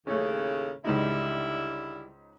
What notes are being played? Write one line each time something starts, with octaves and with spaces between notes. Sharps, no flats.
D#2 A2 C#3 A3 C#4
C#2 G#2 D3 G3 D#4 E4